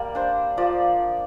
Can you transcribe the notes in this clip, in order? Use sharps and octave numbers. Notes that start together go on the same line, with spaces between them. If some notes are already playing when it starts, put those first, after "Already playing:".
Already playing: G3 A#3 D5
D4 C5
F3 D5